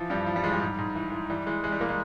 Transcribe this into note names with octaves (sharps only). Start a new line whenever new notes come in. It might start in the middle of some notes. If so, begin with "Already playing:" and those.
Already playing: E3 F3
G2 G3
E3 F3
G3
E3 G#3
G3
G#2
G#2
E3
E3
E3 G3
E3 G#3
E3 G#3
G3
E3 A#3
G#3